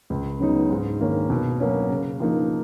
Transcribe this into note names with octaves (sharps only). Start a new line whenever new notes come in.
C#2
C#3 F#3 B3 D#4
G#2
D#3 A#3 C#4
B2
F#3 A#3 C#4
C#3
F3 A#3 D#4